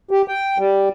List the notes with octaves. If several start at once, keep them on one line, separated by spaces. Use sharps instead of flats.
G4
G5
G3